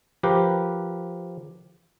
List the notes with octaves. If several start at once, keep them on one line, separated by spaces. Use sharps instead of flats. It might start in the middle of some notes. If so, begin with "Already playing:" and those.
F3 G4 A#4 B4